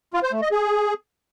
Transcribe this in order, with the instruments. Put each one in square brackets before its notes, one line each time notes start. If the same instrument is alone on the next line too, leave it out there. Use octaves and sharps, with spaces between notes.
[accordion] F4
C5
A3
D#5
G#4